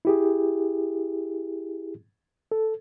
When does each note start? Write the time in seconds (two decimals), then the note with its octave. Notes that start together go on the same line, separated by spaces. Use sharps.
0.05 E4 G4 G#4
2.52 A4